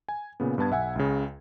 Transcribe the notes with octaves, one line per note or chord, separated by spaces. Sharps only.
G#5
A#2 C#3 B3
G2 B3 A5 G#6
B1 E5 F#5 G#5 E6
C#2 C#3